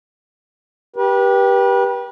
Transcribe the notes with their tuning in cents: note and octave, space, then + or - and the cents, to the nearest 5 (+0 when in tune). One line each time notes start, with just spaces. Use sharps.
G4 +0 B4 -35